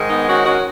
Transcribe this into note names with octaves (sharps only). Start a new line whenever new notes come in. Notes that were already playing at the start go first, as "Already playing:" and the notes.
Already playing: G#2 D#3 G#3
B3 D#4
C#4 F#4
C#4 F#4